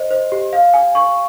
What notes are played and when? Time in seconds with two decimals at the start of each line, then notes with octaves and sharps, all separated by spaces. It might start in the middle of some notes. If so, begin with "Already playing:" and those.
Already playing: C5 D#5
0.11 C5
0.32 G4
0.53 F5
0.74 G#5
0.95 C#6